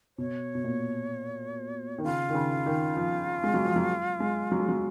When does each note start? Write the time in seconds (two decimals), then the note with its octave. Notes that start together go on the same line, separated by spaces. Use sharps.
0.18 B2 C#5
0.55 B2
0.64 A#2
1.98 D#3
2.03 C#3 F4
2.29 D#3
2.34 C#3
2.66 D#3
2.97 F3
3.44 G#3
3.54 F#3
3.65 F3
3.76 F#3
4.20 G#3
4.52 F#3
4.60 G#3
4.68 F#3